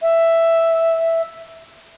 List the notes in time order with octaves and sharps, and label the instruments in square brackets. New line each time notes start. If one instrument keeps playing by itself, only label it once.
[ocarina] E5